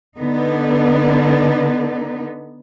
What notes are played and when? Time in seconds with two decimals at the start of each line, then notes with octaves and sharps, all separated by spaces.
0.17 D3 B3 D#4